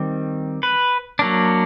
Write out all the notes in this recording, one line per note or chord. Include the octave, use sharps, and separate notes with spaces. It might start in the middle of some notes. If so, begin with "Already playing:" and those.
Already playing: D#3 G3 C4
B4
F#3 A#3 D4